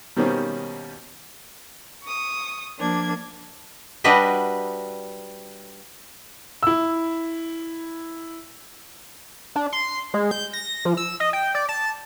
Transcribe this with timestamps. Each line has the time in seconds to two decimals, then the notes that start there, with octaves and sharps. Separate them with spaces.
0.16 B2 D#3 G3 A#3 C4 C#4
2.02 C#6 D#6
2.78 F3 A#3 D4 G#6
4.04 G3 D4 F#4 B4 D#5 E5
6.63 E4 E6
9.56 D4
9.72 C6
10.14 G#3
10.31 G6
10.53 A#6
10.85 F3
10.97 E6
11.20 D#5
11.33 G5
11.55 D5
11.69 A5